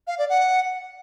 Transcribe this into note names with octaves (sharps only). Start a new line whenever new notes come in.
F5
D5
F#5